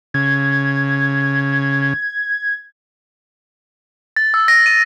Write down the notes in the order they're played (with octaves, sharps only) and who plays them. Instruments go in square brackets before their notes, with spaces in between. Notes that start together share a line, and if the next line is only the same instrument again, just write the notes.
[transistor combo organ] C#3 [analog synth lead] G#6
[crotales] A6
E6
A#6
D#7